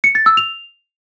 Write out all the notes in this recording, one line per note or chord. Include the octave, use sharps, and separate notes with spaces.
C#7
A6
E6
F7